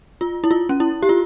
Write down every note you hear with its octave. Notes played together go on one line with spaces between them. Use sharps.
F4
E4
F4
C#4
E4
G4
F4